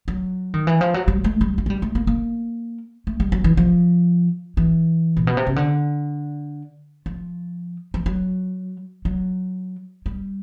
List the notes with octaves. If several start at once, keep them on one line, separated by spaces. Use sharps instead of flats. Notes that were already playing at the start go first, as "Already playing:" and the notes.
F#3
D#3
E3
F3
F#3
G3
A3
G3
G3
G#3
G3
A3
A#3
A#3
A3
G3
F#3
E3
F3
E3
A#2
B2
C3
C#3
D3
F3
F3
F#3
F#3
G3